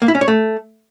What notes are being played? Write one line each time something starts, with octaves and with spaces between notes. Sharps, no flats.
A#3
E4
C#4
C#5
A3